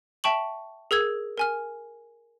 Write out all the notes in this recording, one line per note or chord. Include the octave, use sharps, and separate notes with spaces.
E5 G5 A5 C#6 F#7
G#4 A#4 E6 G#6
A#4 G#5 F6